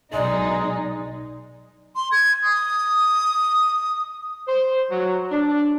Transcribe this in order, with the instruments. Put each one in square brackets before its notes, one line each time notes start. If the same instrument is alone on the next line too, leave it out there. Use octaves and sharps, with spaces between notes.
[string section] B1 D#4 [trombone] G#3 [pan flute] D5
[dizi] C6
G#6
D#6
[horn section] C5
F#3
D4